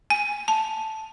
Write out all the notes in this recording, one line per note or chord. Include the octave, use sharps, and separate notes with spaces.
G#5
A5